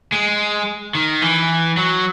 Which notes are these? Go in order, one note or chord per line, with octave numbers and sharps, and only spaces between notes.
G#3
D#3
E3
F#3